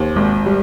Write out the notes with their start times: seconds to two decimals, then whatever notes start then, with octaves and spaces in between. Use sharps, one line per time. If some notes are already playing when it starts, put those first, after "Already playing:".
Already playing: D#2 C5
0.16 G#1
0.46 G3